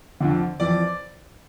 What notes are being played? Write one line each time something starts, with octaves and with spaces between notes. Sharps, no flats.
F2 D3
F2 E3 D5